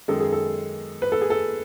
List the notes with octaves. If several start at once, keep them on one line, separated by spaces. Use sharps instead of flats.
F#2 D#3 G#3 A4
G#4
A4
B4
A4
G#4
A4